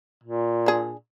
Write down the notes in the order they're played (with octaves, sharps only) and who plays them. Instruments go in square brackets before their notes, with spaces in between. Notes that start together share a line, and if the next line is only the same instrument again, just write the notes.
[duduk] A#2
[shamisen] D4 G#4